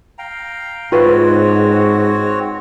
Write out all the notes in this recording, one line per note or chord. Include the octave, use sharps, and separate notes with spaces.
F5 G5 A#5
G#2 C4 F4 F#4 B4 C#5